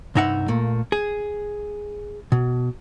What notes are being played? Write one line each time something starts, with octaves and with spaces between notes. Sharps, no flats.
C2 G2 D#4 E5 F#5
A#2 A3 A#3
G#4
B2